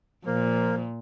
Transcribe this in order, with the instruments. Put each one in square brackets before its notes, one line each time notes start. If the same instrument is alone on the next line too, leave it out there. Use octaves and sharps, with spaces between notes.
[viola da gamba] A#2 [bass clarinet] F3 [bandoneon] A#3